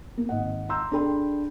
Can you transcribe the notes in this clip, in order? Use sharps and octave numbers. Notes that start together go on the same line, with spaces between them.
A#3
G#1 D#5 F#5
A#5 C6 E6 G6
D4 G#4 A4 G5 B5 C6